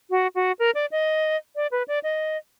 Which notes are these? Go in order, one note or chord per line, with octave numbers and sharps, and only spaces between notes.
F#4
F#4
A#4
D5
D#5
D5
B4
D5
D#5